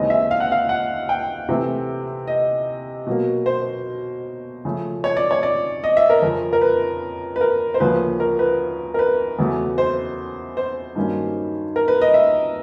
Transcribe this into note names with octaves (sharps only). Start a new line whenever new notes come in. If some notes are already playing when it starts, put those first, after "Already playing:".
Already playing: D#2 C#3 E3 G#3 C4 D#5
E5
F5
F#5
F5
F#5
G5
C3 E3 A3 C4
D#5
B2 F#3 A#3
C5
C#3 F3 A3
C#5
D5
C#5
D5
D#5
E5
A#4
F2 C#3 F3 A#4
A#4
B4
B4
A#4
C5
D2 C#3 F3 A#3 B4
A#4
B4
A#4
B4
E2 C#3 F#3 A3
C5
C5
G2 D#3 F#3 A#3 C#4
A#4
B4
D#5
E5